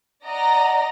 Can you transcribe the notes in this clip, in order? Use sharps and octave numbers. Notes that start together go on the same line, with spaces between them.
D5 D#5 F#5 A#5 A#6